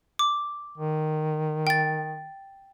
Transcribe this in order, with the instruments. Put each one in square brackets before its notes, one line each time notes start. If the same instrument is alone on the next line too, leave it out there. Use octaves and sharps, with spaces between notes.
[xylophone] D6
[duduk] D#3
[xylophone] G5 A6